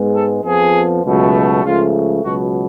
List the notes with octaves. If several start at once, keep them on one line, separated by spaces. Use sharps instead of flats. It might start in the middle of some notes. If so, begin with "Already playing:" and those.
Already playing: G#2 G#3 B3
A4
F2 F3 B3 G#4
C#2 B2 F#3 A3
C#2 C#3 F3 A3 F4
C#2 B2 F#3 F#4